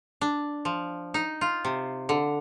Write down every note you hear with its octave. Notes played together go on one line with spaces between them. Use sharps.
D4
F3
D#4
F4
C3
D3